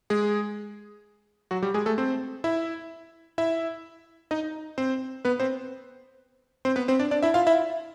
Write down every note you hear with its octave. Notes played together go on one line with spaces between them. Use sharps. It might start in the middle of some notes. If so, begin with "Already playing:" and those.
G#3 G#4
F#3 F#4
G3 G4
G#3 G#4
A3 A4
C4 C5
E4 E5
E4 E5
D#4 D#5
C4 C5
B3 B4
C4 C5
C4 C5
B3 B4
C4 C5
D4 D5
D4 D5
E4 E5
F4 F5
E4 E5